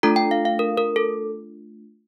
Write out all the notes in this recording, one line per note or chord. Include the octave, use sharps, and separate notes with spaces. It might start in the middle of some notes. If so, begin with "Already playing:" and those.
A3 D4 F4 A4 A#5
G5
F5
F5
A#4
A#4
A4